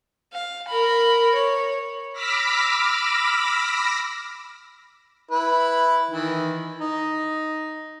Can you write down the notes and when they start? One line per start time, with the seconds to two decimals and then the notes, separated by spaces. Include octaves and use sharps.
0.33 F5
0.68 A#4 B5
1.34 C#5
2.13 B5 D6 E6 F6 A#6 B6
5.31 E4 B4
6.11 D#3 E3
6.81 D#4